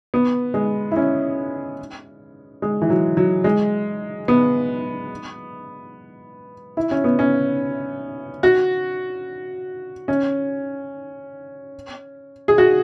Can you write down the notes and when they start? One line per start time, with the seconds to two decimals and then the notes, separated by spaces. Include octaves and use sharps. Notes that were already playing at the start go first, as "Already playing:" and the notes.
0.14 B3
0.54 G#3
0.91 E4
0.96 C#4
2.62 G#3
2.82 E3
2.90 F#3
3.17 F#3
3.44 G#3
4.28 B3
6.77 E4
6.91 C#4
7.04 B3
7.19 C#4
8.43 F#4
10.08 C#4
12.48 G#4
12.58 F#4